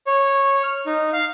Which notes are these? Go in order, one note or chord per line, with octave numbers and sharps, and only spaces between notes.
C#5
F6
D#4
F5